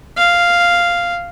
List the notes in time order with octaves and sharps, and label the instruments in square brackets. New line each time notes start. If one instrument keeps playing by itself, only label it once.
[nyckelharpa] F5